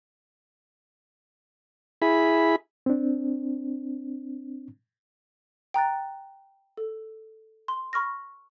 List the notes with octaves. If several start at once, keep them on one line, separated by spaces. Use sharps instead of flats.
E4 G#4 B5
C4 D4
G5 A#5 F#6 A6
A4
C6
B5 C#6 F6 A#6